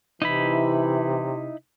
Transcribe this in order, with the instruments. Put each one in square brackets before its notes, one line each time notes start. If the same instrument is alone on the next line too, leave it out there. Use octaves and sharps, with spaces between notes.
[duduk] C3 [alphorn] E3 [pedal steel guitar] D#4 E4 B5